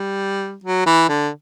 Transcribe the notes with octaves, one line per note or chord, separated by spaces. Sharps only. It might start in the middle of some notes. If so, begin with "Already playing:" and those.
Already playing: G3
F#3
E3
D3